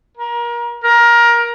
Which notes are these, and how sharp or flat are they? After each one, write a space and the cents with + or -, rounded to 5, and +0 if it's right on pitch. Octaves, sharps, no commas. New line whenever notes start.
A#4 +30
A#4 +20